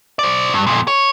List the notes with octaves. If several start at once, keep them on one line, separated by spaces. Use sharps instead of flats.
C5 D5
G2
F2 A#2
C#5